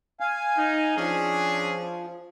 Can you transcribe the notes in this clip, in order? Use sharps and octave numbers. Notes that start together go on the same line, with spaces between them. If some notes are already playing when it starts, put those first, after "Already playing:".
F5 G#5
D#4
F3 C#4 D4 G#4